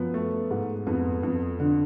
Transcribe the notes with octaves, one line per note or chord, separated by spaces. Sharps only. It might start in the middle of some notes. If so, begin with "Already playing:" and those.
Already playing: F#2 F3 B3
A3
G#2
F2 B3
F2
D3